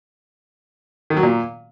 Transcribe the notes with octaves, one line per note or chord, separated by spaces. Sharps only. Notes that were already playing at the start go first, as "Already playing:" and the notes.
D#3
F#3
A#2